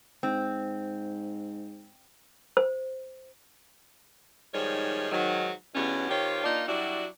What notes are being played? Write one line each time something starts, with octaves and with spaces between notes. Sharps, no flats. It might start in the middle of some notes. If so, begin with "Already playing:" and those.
G#2 C4
C5
G#2 D#3 F3 G3 C#5
G#2 D#3 F#3
E2 G2 B2 C#4
D#3 C4 F4 G4 C#5
A#3 D4 D#4 F4
F#3 G3 D4 E4 F#4